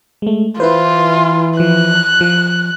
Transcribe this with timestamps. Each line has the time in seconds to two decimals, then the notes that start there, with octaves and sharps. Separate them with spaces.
0.22 G#3 A3
0.60 E3 E4 F4 B4 C5
1.60 F3 F#6
2.21 F3